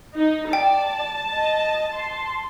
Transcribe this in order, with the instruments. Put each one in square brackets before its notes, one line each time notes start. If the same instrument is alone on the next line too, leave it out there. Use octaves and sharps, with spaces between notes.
[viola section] D#4
[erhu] D5 [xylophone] G5 [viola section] A5
[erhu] D#5
C6